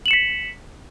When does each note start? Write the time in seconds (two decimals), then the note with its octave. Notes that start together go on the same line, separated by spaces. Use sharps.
0.06 F#7
0.08 E7
0.11 C#7
0.13 B6